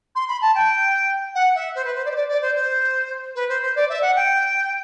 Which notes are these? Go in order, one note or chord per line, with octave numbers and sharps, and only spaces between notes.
C6
B5
A5
G5
F#5
E5
C5
B4
C5
D5
C5
D5
D5
C5
C5
B4
C5
C5
D5
E5
F#5
G5